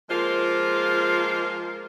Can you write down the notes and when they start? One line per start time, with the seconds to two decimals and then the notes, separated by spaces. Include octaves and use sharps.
0.10 F3 G#3 A#3 F4 C5